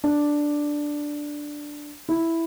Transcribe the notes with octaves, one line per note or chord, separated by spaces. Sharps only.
D4
E4